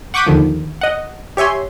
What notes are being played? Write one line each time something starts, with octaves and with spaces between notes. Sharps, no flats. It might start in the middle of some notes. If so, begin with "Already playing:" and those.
F#5 C#6 D6 G6 B6 D#7
D#2 D3 D#3 F3
D#5 F#5
G4 C#5 E5 G#5 C6